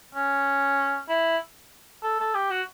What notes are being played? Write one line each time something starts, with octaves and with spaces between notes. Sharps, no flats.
C#4
E4
A4
A4
G4
F#4